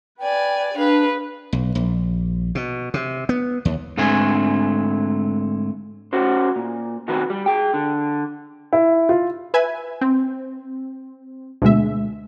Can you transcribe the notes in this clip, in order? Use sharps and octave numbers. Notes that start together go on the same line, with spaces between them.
B4 D5 G5 G#5
D4 G#4 B4 F5
B1
A#1
B2
C3
B3
D#2
G#2 D3 A3 C4 G#5
C#4 F#4 C5
A#2
B2 D#3 F#3 C4 F#4 B4
G3
G#4 G5
D3
E4
F4
B4 E5 G#5
C4
D2 B2 G#3 E5